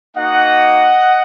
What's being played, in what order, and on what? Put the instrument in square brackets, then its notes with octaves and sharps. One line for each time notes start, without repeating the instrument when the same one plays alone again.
[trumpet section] A#3 D#4 F#4 D#5 F#5